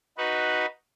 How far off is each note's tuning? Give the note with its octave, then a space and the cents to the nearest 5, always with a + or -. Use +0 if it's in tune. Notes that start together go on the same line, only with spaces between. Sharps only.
D#4 +0 F#4 +0 B4 -5